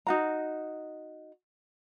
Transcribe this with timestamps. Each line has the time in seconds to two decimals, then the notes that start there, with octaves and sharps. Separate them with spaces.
0.07 D#4 F#4 A#5